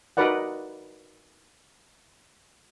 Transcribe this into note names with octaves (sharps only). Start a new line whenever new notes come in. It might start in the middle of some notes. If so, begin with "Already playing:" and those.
D#4 F#4 A#4 B4 D5 F#5